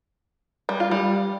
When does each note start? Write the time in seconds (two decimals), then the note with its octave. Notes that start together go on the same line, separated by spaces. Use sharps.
0.69 G3
0.80 F4
0.91 G3